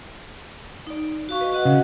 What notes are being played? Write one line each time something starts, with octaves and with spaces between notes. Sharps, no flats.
D#4 D5
F#4 F5 C#6
B4 D#5
F#4 D#5 F#5
C#3